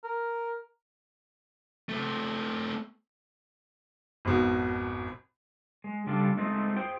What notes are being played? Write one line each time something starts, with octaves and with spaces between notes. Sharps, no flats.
A#4
A3 C4
G#1 F2 B2
G#3
C#3 G3 D4 F4 A4
G#3 A3 C4 D#4 F4 G#4
F4 G#4 C5 G5